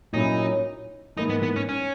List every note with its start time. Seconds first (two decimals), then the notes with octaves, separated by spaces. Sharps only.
0.13 A#2 F#3 C#4 D#4 E4
1.17 G#2 E3 A#3 D#4 E4
1.29 B3
1.43 B3
1.56 C#4
1.69 C#4